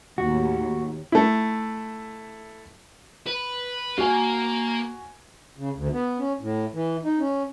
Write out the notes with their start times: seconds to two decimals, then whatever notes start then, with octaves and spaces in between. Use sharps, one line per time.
0.18 D#2 A2 F#4
1.12 A3 E4
3.27 B4
3.98 A#3 F#4 G#5
5.57 C#3
5.75 D2
5.93 B3
6.19 C#4
6.40 A2
6.74 E3
7.04 D#4
7.19 C#4